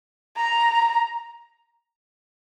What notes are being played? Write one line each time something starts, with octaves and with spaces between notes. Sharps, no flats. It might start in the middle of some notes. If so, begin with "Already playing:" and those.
A#5